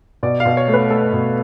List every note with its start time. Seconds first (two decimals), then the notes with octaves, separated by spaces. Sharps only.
0.23 B2 D5
0.40 F5
0.46 B2
0.57 C#5
0.68 A3
0.74 B4
0.90 A3 A4
1.13 B2